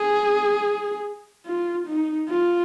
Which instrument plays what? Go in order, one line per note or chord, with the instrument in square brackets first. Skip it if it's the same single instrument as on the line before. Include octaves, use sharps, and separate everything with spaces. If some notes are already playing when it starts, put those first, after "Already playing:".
Already playing: [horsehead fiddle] G#4
F4
D#4
F4